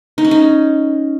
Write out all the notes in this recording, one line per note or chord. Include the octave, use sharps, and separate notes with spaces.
D#4
C#4
D#4